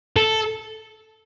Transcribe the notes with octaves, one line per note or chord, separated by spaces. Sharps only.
A4